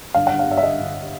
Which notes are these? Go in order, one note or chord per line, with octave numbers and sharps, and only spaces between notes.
G1 F5
G1 F#5
F5
G2 E5
E5
G1 D#5
G1